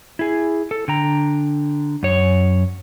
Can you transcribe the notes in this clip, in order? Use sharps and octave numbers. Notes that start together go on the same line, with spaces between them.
E4 G#4
A4
D3 G5 A#5
F#2 C#5